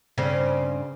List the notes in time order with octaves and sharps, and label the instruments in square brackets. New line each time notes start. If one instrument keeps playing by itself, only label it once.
[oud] G2 C#3 C4